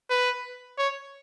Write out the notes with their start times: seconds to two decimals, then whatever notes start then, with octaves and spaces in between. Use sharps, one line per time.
0.10 B4
0.78 C#5